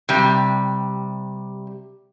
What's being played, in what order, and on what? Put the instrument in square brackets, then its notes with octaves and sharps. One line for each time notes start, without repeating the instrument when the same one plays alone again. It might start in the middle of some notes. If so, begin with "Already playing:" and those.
[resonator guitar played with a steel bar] C3 G3